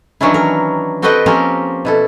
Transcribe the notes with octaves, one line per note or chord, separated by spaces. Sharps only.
D#3 E3 F#3 C#4 D4 E4
A#4
C4 F#4 A4 B4 D#5 G5
F3 A#3 C4 C#4 G4 A#4
B2 E4 A4